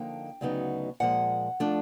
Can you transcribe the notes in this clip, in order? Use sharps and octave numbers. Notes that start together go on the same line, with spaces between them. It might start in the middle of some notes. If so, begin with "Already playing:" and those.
Already playing: D3 F3 A#3 D#4 G5
D2 C#3 F#3 B3 D#4
A#2 F3 G#3 F#5
F3 A3 D4